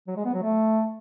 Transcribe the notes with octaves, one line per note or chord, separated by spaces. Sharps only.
F#3
G#3
B3
F#3
A3